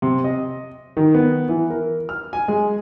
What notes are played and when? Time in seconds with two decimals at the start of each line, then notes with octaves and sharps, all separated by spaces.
0.02 C3
0.24 D#5
0.97 D#3
1.15 B3
1.49 E3
1.70 A#4
2.09 F6
2.33 G#5
2.48 G#3